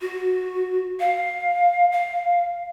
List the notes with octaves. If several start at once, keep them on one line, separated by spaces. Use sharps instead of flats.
F#4
F5
F5